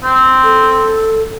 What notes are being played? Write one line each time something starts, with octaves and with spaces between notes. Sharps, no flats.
C4
A4